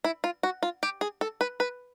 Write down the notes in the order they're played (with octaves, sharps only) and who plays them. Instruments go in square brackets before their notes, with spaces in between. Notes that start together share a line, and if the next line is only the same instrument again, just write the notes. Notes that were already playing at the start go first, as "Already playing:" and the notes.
[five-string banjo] E4
F4
F#4
F4
G4
G#4
A4
B4
B4